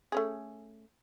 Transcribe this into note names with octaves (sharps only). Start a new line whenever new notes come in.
A3 C#4 G#4